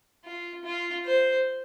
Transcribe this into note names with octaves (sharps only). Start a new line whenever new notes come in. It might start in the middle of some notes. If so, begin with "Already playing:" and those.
F4
F4
C5